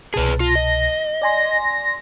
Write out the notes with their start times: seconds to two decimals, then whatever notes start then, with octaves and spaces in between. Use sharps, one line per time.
0.14 C2 B2 G#4 B4 A5
0.40 F4 A#6
0.55 D#5
1.22 D5 G#5 C6 A#6